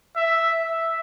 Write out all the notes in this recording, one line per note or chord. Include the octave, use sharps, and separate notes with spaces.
E5
E5